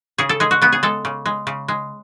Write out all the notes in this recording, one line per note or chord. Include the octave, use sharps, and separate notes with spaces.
C#3 G#4
A4
G#3 G#4
F#4
C#3 B3
G#4
G#3 A4
C#3
G#3
C#3
G#3